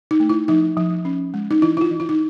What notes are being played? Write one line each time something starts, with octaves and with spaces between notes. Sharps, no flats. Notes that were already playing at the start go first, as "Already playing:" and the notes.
D#4
A3
E4
F3 D#4
F3
C#4
G#3
D#4
E3 E4
E4
F4
E3
E4
D#4